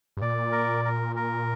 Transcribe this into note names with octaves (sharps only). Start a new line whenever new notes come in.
G2
A#2 D5
A#4
A#4
A#4